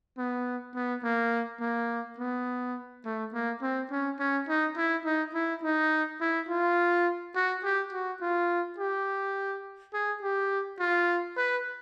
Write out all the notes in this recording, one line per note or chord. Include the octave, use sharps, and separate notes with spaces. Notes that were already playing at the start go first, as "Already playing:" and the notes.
B3
B3
A#3
A#3
B3
A3
A#3
C4
C#4
C#4
D#4
E4
D#4
E4
D#4
E4
F4
F#4
G4
F#4
F4
G4
G#4
G4
F4
B4